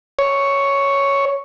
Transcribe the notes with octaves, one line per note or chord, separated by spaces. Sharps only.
C#5